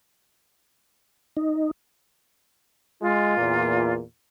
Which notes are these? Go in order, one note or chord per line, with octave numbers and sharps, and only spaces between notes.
D#4
G#3 F4
E2 A#2